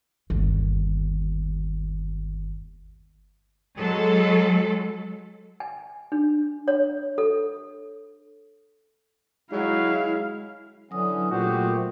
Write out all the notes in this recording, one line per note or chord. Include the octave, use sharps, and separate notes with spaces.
G1 D#2
F#3 G#3 A4
G#5
D4
C#5
A4
F#3 G#3 E4 F5
D3 E3 F#3 C#4 D#6
A#2 A3 F#4 G4 C5